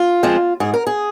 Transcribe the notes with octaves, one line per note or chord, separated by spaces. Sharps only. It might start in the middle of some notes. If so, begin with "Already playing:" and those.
Already playing: F4
F3 G#3 C4
G#2 G#4
A#4
G#4